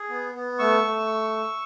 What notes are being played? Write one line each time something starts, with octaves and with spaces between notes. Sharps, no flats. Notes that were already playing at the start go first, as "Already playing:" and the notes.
Already playing: G#4
B3
B3
A3 C#6 E6
A3